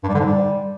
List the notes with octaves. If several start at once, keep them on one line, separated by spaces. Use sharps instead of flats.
G2
G3
D3
G#2
G3